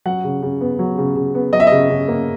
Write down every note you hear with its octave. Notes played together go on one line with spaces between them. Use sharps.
F#3 F#5
C#3
C#3
B3
F#3
C#3
C#3
B3
F#3 D#5
E5
C#3 D#5
C#3
A#3